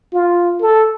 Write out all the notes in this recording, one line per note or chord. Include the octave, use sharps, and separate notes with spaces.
F4
A4